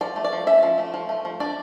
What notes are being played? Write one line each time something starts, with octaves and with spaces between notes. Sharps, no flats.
F3 D5
A3
D5
F3
C#4 E5
F3
A3
F3
A3
F3
D4 D5